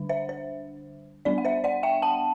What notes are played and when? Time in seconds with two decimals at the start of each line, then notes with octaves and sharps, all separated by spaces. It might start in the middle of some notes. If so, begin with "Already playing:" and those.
Already playing: D3 G3 D4
0.09 C5 E5
0.29 C5
1.25 G3 B3 D4 D5
1.38 F#5
1.45 C5 E5
1.64 D5 F#5
1.83 E5 G5
2.02 F#5 A5